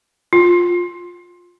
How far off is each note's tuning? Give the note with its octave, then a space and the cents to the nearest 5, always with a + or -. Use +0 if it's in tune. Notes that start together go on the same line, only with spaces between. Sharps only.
F4 +15